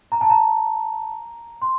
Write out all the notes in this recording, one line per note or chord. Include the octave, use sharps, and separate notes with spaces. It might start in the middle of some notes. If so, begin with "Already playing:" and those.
A#5
A5
A#5
C6